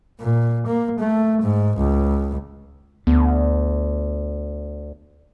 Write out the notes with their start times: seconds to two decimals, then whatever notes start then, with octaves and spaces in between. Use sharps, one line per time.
0.20 A#2
0.67 A#3
0.99 A3
1.42 G#2
1.77 C#2
3.07 D2 B3